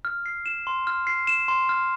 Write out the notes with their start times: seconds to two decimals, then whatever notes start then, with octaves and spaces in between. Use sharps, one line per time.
0.05 F6
0.26 C7
0.46 E7
0.67 C6
0.87 F6
1.07 C7
1.27 E7
1.48 C6
1.69 F6